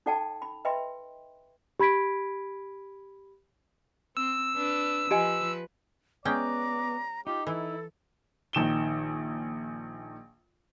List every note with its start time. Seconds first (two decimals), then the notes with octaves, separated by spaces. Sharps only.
0.06 D#4 A4 D5 F#5 G5 A5
0.42 B5
0.65 B4 D#5 E5 G5 B5 C6
1.79 G4 B5 G#6 B6 D7
4.17 C4 E6
4.56 D4 B4
5.11 F3 G4 B4 D#5 G#5 E6
6.25 G#3 B3 C#4 D5 G5 A#5
7.27 D#4 F4 G4
7.47 E3 E4 A4
8.53 A#1 D#3 E7 G7